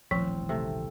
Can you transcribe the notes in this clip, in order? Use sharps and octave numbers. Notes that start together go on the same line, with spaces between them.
D#1 A1 F3 C4
C3 A3